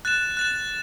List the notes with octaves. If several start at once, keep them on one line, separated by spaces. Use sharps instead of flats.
F#6 A6 E7
F#6 A6 E7